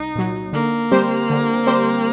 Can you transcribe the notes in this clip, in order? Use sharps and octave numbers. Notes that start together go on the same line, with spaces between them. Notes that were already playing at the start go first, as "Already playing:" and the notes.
Already playing: C2 D#4
A#2 F#3
D3 A#3
G3 C4 G4 C5
D3
G3 C4 G4 C5